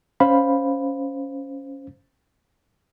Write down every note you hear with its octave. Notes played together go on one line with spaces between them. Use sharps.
C#4 C5 F5 B5